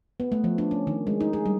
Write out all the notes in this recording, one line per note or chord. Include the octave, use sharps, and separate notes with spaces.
B3
A3
F3
D4
C#4
D#3
G#3
D#4
G#4
G3